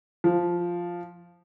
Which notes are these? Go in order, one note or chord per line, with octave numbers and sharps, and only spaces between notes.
F3